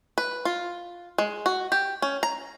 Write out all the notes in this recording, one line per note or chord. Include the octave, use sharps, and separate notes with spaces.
B4
F4
G#3
F#4
G4
C#4
A#5